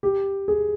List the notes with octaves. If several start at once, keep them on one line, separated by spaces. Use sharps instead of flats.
G4
G#4